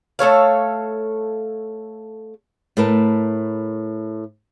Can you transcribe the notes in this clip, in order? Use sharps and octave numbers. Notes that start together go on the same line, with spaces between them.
A3 A4 C#5 F5
A2 A3 A#4 B4 A5